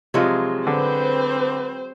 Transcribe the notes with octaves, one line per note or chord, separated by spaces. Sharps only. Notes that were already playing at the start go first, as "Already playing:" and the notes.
C3 F3 F#3 G#3 F4
D3 C4 B4 C5